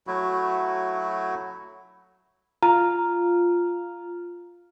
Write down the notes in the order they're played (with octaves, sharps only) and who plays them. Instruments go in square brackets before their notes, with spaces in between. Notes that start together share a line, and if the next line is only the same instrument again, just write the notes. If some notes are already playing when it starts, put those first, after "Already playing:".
[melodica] F#3 A3 E4 F#4
[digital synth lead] F4 [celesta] A#5